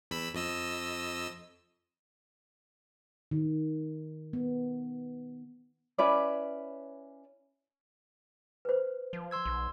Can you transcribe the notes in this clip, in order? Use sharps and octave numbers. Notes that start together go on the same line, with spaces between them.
E2 B5 E6
F2 D#5 E6
D#3
B3
C#4 E4 B4 D5
B4 C5
F3
C6 E6 G#6
B1